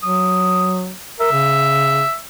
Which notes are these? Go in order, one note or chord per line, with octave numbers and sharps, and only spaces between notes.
F#3 D#6
A#4 E5
C#3